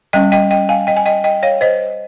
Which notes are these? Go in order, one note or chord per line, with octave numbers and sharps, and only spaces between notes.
G3 C#4 D#5 G5
D#5 G5
D#5 G5
F5 G#5
D#5 G5
G#5
D#5 G5
D#5 G5
C#5 F5
C5 D#5